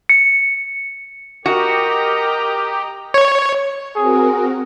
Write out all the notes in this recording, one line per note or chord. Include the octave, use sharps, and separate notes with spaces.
C#7
F#4 G4 A#4 D#5 A#5
C#5
C4 F#4 G#4 A#4